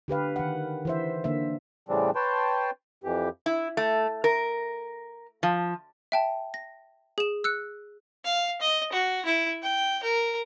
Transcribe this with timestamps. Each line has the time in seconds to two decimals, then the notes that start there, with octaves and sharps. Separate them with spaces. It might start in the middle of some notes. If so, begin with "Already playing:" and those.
0.08 D3 G4 B4 F5
0.36 D#3 F#5
0.85 E3 C5 E5
1.24 D3 A#3 E5
1.89 A2 C#3 E3 G3 C4 D4
2.15 B4 C#5 G5 A5 C6
3.04 F2 E3 G4
3.46 E4
3.77 A3
4.24 A#4
5.43 F3
6.12 E5 G5 A5
6.54 A#6
7.18 G#4 E7
7.44 E6 F#6 C#7
8.25 F5
8.61 D#5
8.92 F#4
9.25 E4
9.63 G5
10.03 A#4